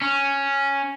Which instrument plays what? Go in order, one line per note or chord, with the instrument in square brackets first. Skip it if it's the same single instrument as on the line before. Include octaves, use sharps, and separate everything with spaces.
[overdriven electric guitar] C#4